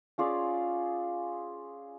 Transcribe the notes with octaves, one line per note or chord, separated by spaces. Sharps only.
C#4 F4 G#4 D5